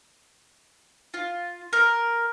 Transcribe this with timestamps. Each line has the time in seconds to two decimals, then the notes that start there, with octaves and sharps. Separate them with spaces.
1.14 F4
1.73 A#4